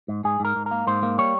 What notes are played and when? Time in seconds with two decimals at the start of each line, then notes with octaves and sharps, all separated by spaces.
0.08 G#2
0.24 G#2 G#4
0.40 G#2 A#4
0.56 G#2
0.66 A#4
0.71 A#3
0.87 G#2 C5
1.03 A#3
1.18 G3 C#5